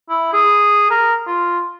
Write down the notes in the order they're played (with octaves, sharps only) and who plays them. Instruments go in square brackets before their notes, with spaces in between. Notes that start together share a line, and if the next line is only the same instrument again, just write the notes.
[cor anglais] E4
G#4
A#4
F4